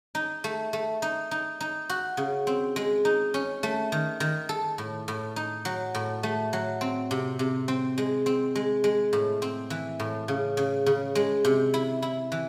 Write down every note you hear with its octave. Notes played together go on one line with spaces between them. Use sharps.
D#4
A3
A3
D#4
D#4
D#4
F#4
C#3
C4
G#3
D#4
C#4
A3
D#3
D#3
A4
A2
A2
D#4
F#3
A2
A3
F#3
C4
C3
C3
C4
G#3
C4
G#3
G#3
A2
C4
E3
A2
C#3
C#3
C#3
G#3
C3
E4
E4
E3